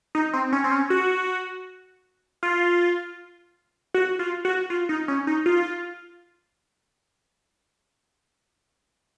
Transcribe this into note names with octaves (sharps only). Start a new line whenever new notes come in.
D#4
C4
C#4
C4
C#4
F#4
F4
F#4
F4
F#4
F4
D#4
C#4
D#4
F4